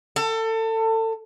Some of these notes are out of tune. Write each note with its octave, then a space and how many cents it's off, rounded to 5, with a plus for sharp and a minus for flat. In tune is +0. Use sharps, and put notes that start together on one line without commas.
A4 +25